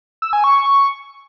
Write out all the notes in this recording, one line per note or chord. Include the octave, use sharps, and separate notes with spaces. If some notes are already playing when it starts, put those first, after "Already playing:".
E6
G#5
C#6